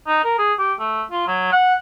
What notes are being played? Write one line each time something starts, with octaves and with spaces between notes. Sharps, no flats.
D#4
A#4
G#4
G4
A3
F4
F#3
F#5